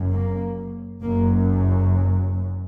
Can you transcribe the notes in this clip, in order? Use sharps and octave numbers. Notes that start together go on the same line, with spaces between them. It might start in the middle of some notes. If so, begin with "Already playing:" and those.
Already playing: F#1 F#2
A#3
F#1 F#2 A#3